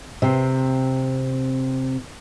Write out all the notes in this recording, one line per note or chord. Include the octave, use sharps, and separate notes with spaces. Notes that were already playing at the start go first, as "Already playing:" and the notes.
C3 C4